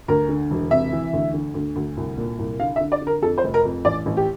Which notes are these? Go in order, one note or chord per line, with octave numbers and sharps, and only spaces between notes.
D2 A#4
D3
E1
C3 E5
E3
D2
D3
D2
D2
C2
A#2
C2
D3 F5
E5
D3
D5
D3
A#4
F2 A4
C5
F1
A#4
F2
A1 D5
A1
G4